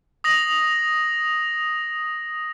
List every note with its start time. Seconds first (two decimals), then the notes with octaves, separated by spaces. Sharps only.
0.24 D#6 A#6 F7 F#7